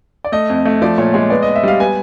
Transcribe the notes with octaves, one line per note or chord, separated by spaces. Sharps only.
D5
A3 D#5
F2
A3
F3 D5
A#2 C#5
G#3 C#5
B3 D5
D#5
B3
E5
G3 F5
B3 G#5